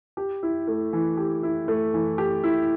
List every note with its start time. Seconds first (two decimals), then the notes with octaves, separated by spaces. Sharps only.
0.17 G4
0.43 E4
0.67 A3
0.93 E3
1.17 G4
1.43 E4
1.68 A3
1.94 E3
2.18 G4
2.44 E4